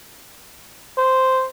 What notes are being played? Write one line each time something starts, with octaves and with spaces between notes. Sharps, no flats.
C5